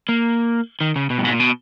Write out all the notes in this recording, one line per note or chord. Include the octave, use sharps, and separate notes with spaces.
A#3
D#3
C#3
B2
G2
G#2
A#2
B2